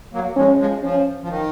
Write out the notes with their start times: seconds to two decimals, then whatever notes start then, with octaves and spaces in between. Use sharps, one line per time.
0.13 F#3 A#3
0.36 F3 G#3 C#4
0.59 F3 G#3
0.82 F3 C#4
1.22 F3
1.29 D#3